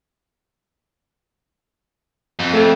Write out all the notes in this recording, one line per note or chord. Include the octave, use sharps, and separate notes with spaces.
F2
A3